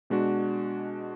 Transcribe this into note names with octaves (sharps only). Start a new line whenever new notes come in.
B2 G#3 D4 F#4